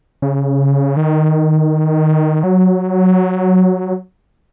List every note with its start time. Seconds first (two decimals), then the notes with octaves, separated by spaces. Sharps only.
0.22 C#3
0.97 D#3
2.43 F#3